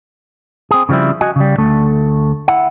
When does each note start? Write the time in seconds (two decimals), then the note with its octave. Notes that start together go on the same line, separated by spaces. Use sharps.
0.71 C4 G#4
0.89 C#3 F3 G3 C4 E4
1.21 F#4 D#5 G#5
1.36 C#3 G3
1.58 D2 A3 A4
2.48 E4 F#5